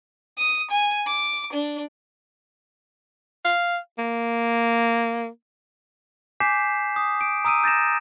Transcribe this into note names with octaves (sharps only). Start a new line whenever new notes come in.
D#6
G#5
D6
D4
F5
A#3
G#5 D6 G6 B6 C7 E7
D#6
D7
A#5 D#6 E6 D7 D#7
G6 A6 A#6 E7